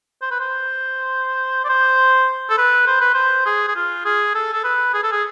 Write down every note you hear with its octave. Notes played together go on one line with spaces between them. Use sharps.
C5
B4
C5
D5
C5
A4
B4
C5
B4
C5
G#4
G#4
F4
G#4
A4
A4
B4
G#4
A4
G#4